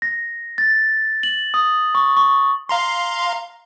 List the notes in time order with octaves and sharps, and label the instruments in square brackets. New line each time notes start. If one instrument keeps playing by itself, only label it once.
[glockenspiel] A#6
A6
F#7
D#6
C#6
C#6
[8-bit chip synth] F5 A#5 C6